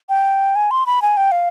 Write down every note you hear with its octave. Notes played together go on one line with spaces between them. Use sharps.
G5
G#5
C6
B5
G#5
G5
F5